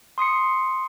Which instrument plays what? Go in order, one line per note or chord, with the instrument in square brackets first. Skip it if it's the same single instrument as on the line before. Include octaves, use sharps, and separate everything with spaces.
[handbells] C6 D#6 C7 C#7